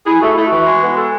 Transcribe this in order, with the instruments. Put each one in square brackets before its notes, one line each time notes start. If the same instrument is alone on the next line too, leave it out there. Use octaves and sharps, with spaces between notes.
[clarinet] E4 [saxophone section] G#4
[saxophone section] A3 [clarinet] F#4
[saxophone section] A3 [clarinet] E4
[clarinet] F#4
[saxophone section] E3
G#3
B3
[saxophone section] G#3 [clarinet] A4